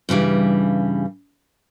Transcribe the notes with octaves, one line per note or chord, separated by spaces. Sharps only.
G2 C#3 E3 G3